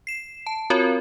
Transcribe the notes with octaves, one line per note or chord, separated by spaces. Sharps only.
C7 E7
A5
C4 F4 F#4 A#4 C#5